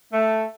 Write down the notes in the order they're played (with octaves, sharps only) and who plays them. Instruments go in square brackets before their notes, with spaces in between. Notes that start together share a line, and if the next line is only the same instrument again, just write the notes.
[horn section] A3